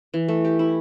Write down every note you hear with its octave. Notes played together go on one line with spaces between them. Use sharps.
E3
A3
G4
E4